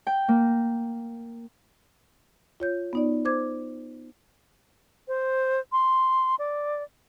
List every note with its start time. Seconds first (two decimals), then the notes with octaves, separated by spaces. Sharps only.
0.07 G5
0.28 A#3
2.60 F4 C#5 G6
2.93 B3 D#4 D5
3.25 C5 D6 G#6
5.08 C5
5.72 C6
6.39 D5